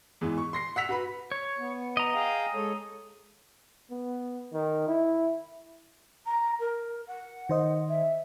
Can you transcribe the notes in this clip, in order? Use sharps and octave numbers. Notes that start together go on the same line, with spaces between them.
E2 G#2 E3
C#6
C6 A#6 C7
F#5 E6 B6 F7
F#4 B4 B5
C#5
B3
D#5 A#5
G#4 F5 G5
G#3 A4 C#5
B3
D#3
E4
A#5
A#4
F#5
D#3 C5 D#5
E5